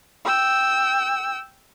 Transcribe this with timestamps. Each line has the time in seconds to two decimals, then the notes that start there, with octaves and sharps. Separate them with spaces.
0.25 G5 E6